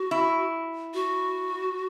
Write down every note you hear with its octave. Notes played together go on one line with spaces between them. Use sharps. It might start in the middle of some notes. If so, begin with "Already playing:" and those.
Already playing: F#4
E4
F#4